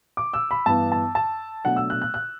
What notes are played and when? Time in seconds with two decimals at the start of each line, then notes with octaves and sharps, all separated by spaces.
0.17 D6
0.33 E6
0.51 B5
0.66 G2 E3 B3 A5
0.92 A5
1.15 A5
1.65 B2 F#3 A3 D4 F#5
1.76 E6
1.90 F#6
2.01 F#6
2.14 F#6